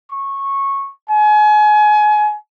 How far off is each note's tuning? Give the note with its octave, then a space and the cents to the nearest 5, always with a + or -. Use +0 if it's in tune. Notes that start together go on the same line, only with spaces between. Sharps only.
C#6 -15
G#5 +30